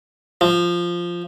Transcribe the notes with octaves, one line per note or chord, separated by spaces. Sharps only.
F3